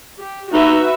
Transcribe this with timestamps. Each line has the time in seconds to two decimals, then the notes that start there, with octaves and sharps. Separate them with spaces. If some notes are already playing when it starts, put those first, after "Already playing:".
0.19 G4
0.53 D#4 F#4 B4 E5